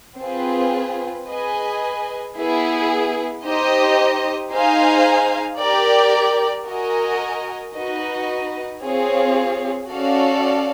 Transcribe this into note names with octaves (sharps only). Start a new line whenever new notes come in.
C4 F4 G#4 B4
G#4 B4 D#5 G#5
B3 E4 G#4
D#4 G4 C5 D#5
D#4 G#4 C5 F5 G#5
G4 A#4 D5 G5
F#4 A#4 D#5 G#5
D#4 F#4 B4 D#5
C4 F4 G#4 C#5 F5
C#4 F#4 A4 D5 F5